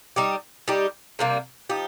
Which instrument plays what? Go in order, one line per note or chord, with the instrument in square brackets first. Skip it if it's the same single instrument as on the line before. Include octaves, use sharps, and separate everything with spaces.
[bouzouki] G3 D#4 G4
G3 D#4 G4
C3 G3 A#3
F3 D#4 G4